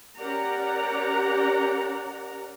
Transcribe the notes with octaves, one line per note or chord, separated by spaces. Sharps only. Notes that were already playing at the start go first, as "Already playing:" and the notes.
C#4 G4 A#4 D5 F#5 A#5